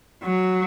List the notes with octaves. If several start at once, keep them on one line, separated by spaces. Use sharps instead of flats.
F#3